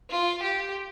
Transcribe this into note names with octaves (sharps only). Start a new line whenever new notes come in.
F4
G4